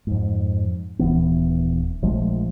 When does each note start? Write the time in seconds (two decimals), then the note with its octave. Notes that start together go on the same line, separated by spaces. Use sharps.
0.07 F2 G#2
0.99 D#1 E3 B3
2.03 A#1 F3 G#3 A3